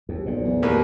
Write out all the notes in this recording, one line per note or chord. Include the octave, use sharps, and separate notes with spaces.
D#2
B1 F2 A#2
E2
D#2 A#3 B4